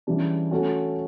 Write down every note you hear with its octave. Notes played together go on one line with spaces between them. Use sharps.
C#3 E3 G3 D4
A3 C#4 F#4 A4